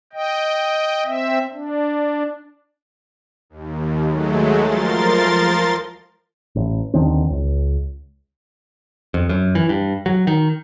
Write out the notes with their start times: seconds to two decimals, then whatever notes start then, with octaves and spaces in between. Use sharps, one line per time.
0.13 D#5 G5
1.05 C4 E5
1.53 D4
3.50 D#2
4.06 F#3 G#3 A3
4.60 F3 A#4 C6 A6
6.55 A1
6.94 D#2 D3 D#3 C4
7.30 C#2
9.14 F2
9.29 F#2
9.55 E3
9.69 G2
10.06 F#3
10.27 D#3